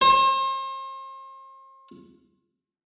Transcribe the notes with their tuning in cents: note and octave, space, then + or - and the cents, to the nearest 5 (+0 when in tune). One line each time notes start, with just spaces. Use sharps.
C5 +40